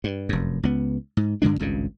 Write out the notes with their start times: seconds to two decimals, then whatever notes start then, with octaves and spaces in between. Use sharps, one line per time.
0.04 G2
0.29 F1 F#2
0.63 C#2 B3
1.17 G#2
1.42 G2 D3 G#3 D4
1.59 G#1 C#2 G2 C#3